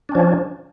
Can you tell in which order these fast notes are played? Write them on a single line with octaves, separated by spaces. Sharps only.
D4 C#4 F3